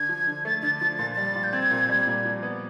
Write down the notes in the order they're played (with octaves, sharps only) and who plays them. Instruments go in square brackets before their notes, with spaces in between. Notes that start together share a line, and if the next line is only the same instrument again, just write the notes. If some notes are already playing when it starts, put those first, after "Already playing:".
Already playing: [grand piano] D3 [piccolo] G#6
[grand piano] F3
D3
[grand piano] A3 [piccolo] A6
[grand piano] D3 [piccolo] A6
[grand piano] F3 [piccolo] A6
[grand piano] A#2 [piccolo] A6
[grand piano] G3 [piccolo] A6
[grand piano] A#2
[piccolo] G6
[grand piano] C4 [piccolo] G#6
[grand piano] A#2
G3
A#2
F3
B3